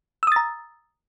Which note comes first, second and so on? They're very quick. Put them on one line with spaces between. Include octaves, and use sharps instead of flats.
E6 D#6 A6 A#5